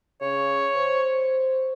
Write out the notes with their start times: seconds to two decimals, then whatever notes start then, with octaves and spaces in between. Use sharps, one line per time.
0.22 C#3 C#5
0.77 C5